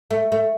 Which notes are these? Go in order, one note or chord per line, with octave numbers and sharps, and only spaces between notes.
A3
A3